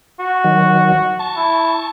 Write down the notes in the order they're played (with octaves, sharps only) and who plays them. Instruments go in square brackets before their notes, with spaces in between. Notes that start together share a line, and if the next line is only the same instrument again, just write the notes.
[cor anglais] F#4
[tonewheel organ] D#3 F#3
A5 C#6
[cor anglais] E4